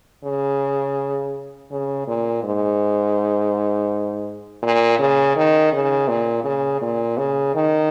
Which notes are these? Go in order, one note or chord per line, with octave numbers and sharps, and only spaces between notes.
C#3
C#3
A#2
G#2
A#2
C#3
D#3
C#3
A#2
C#3
A#2
C#3
D#3